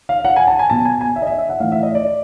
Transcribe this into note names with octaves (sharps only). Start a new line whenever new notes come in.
F5
F#5
G#5
A5
G#5
B2 A5
G#5
G#5
E5
D#5
E5
E5
F#5
A2 E3 F5
E5
D#5
D5